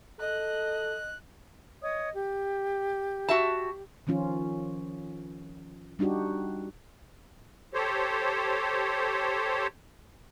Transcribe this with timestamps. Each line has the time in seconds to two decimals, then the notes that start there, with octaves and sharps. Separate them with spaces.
0.19 A4 D#5 F#6
1.82 C#5 D#5 D#6
2.13 G4
3.29 F#4 E5 A5
4.07 D#3 F3 C#4 F4
5.99 G3 D4 D#4 F#4 G4
7.74 G4 A4 C5 C#5